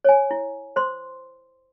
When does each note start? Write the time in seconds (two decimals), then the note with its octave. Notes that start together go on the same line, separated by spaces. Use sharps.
0.04 C#5 G#5
0.31 E4
0.76 C5 C6